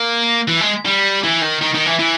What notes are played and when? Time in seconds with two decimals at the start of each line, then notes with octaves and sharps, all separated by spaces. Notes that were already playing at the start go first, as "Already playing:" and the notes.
Already playing: A#3
0.48 E3
0.61 G#3
0.86 G3
1.24 E3
1.42 D#3
1.61 D#3
1.74 D#3
1.86 E3
1.99 E3